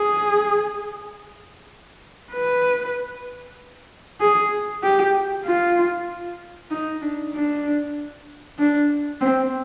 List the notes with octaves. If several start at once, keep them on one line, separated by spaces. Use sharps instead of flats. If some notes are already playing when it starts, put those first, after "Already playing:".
Already playing: G#4
B4
G#4
G4
F4
D#4
D4
D4
D4
C4